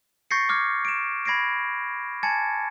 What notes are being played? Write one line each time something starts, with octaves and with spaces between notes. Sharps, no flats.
C#6 G6 A6 A#6 C7 C#7
D6 F6 G6 G#6
D7 E7
B5 G#6 A#6 C7 D7
G#5 A5 G#6 A6 C#7